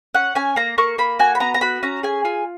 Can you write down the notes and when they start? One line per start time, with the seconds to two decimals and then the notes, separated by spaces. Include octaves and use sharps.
0.14 C#4 F#5
0.35 C#4 G#5
0.56 A#3 A#5
0.78 A#3 C#6
0.98 A#3 B5
1.19 F#4 G#5
1.35 B5
1.40 B3 A#5
1.54 A#5
1.61 F#4 B5
1.83 C#4 A#5
2.03 G#4 G#5
2.25 F4 G#5